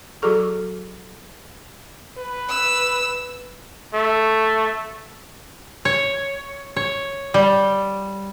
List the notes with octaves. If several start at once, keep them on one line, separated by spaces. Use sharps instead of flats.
F#3 F#4 G#4 A4 C#6
B4
E6
A3
C#5
C#5
G3